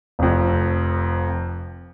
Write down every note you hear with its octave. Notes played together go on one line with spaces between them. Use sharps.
F1 F2